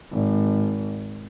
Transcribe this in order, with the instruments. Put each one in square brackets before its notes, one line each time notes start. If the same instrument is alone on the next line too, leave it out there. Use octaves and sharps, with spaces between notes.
[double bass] G#1